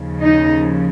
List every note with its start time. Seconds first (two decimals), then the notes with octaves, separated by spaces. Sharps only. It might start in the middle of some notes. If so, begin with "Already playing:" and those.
Already playing: D#2 C#3 F3
0.22 D#4